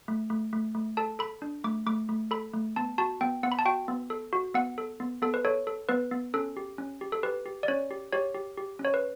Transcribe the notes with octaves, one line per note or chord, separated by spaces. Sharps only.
A3
A3
A3
A3
A4 A5
A4 B5
D4
A3 D6
A3 D6
A3
A4 B5
A3
B3 A5
F#4 A5
B3 G5
B3 F#5
B5
A5
F#4 G5
B3
A4
F#4
B3 F#5
A4
B3
B3 A4
B4
A4 C#5
A4
B3 B4
B3
C#4 A4
G4
C#4
G4
A4
G4 B4
G4
D5
C#4 C#5
G4
G4 C#5
G4
G4
C#4
C#5
B4